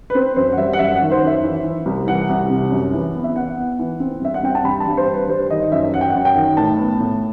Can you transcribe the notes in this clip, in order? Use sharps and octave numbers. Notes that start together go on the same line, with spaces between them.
B4
C4 C5
F#2 C5
F#5
G3 E5
F#5
F#2 E5
F#5
D#3
C5
F#2
E5
E3
E3
C2
E3 F#5
C2
C3
F#2
E3
B3
E5
B3 F#5
B3
E3
C4
G2 E5
F#5
C4 G5
A5
G2 B5
A5
G2
C5
G2
B4
G3 C5
D#3 D#5
F#2 E5
F#2 F#5
G5
F#2 F#5
G5
D#3
A2 A5
B3
A2